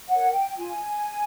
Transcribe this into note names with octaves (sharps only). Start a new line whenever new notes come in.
A#4 C#5 F#5
G5
F4 G#5